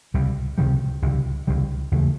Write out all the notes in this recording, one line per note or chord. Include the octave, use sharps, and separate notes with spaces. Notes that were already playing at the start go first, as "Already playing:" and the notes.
C#2 C3 D#3 G3
C#2 C3 D#3 G3
C#2 C3 D#3 G3
C#2 C3 D#3 G3
D#2 C#3 E3 A3